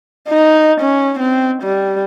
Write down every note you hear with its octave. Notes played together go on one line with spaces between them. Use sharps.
D#4
C#4
C4
G3